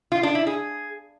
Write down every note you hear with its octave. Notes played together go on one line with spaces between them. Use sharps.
F4
D4
E4
G#4